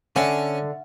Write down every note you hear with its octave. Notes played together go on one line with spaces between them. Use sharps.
D3 C#4 D4 E5 F#5